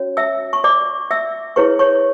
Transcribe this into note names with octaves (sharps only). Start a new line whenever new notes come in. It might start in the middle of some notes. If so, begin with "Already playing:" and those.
Already playing: C#4 F#4 C#5
E5 E6
C#6
D5 D6
E5 E6
E4 G#4 B4 C#5 C#6
C#5 C#6